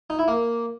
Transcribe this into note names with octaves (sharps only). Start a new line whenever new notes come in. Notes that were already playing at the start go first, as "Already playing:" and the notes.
D#4
E4
A#3